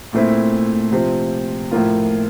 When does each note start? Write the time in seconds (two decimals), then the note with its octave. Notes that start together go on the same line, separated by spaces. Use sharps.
0.13 A#2 A3 C4 E4
0.92 C3 F3 C4
1.71 A2 F3 A#3 F4